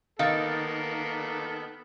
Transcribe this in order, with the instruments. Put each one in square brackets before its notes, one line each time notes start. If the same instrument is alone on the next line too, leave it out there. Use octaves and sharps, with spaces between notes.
[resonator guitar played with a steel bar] D#3 [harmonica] A#3 B3 A4 [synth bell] F5 A6